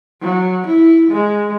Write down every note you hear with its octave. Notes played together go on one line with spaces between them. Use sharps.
F#3
E4
G#3